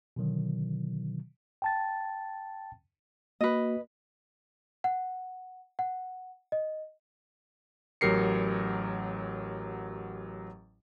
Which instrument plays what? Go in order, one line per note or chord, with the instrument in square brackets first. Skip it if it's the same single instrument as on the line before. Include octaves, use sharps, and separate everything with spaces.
[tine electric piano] B2 D3 D#3 F#3
G5 A5 A6
[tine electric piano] A#3 F#4 [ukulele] B4 D#5
[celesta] F#5
F#5
D#5
[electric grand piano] A1 F#3 G4 A#4 C7 C#7